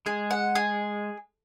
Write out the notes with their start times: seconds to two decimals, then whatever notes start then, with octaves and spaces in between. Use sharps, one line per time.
0.06 G#3 G#4
0.31 F#5
0.55 G#4